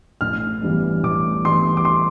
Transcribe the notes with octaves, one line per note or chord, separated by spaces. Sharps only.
A1 F6
G2 E3 G3 B3
A1 D6
G2 E3 G3 B3 C6
D6
C6